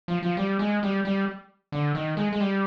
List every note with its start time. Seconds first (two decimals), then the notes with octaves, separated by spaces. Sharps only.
0.08 F3
0.23 F3
0.37 G3
0.59 G#3
0.83 G3
1.05 G3
1.72 D3
1.95 D#3
2.17 G#3
2.33 G#3
2.40 G3